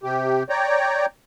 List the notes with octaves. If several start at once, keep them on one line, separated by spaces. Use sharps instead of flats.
C3 G4
C#5 D5 G5 A#5